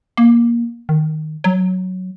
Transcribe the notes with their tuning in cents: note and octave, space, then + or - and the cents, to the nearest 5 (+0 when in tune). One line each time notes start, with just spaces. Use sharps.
A#3 +15
D#3 -5
F#3 +0